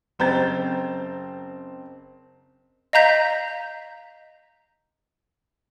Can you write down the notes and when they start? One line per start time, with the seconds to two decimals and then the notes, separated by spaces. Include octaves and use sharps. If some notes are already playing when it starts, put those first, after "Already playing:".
0.19 F#1 C4 A#5 G6 A6
2.93 D#5 F5 A#5 G6 B6